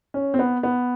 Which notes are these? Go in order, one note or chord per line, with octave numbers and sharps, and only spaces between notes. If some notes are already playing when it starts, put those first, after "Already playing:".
C#4
C4
B3
B3